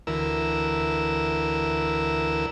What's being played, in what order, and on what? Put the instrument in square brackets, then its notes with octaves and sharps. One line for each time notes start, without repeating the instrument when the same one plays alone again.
[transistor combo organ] D2 E3 A#4 E6